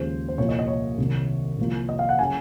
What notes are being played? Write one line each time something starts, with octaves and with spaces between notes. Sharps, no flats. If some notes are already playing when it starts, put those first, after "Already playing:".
Already playing: D#2 C#3 F3 G#3 C5
C5
C2 A#2 F3 A#3 C#5
D#5
D#5
C#5
C2 C3 D#3 F#3
C2 C3 F3 A#3
D#5
F5
F#5
C#3 F#3 G#5